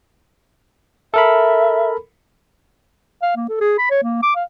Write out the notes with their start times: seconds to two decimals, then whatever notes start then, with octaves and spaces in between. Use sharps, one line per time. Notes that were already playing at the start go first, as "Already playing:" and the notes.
1.14 A4 A#4 E5 B5
3.22 F5
3.36 A#3
3.49 A4
3.61 G#4
3.78 B5
3.90 C#5
4.03 A#3
4.23 D6
4.36 F5